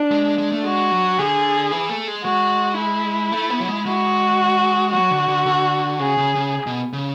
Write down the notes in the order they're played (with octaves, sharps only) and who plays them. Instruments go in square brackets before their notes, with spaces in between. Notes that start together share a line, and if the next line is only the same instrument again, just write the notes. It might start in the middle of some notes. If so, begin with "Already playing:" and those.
Already playing: [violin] D4
[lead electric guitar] G#3
G#3
G#3
A3
[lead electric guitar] G#3 [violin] F#4
[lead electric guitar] F#3
[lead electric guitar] D3 [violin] G#4
[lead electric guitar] E3
A3
G#3
[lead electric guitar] G#3 [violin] F#4
[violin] E4
[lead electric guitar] A3
B3
F#3
G#3
[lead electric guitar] G#3 [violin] F#4
[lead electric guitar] F#3 [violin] F#4
[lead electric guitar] D3
D3
D3
[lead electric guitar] C#3 [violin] G#4
[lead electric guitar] C#3
C#3
B2
C#3